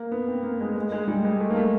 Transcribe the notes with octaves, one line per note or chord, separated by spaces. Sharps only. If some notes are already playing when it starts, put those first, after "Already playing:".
Already playing: A#3
B3
C4
A#3
G#3
G#3
G#3
G3
G#3
A3
A#3
A3